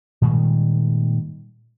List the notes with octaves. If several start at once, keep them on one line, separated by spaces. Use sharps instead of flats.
A#2 D#3 G3 G#3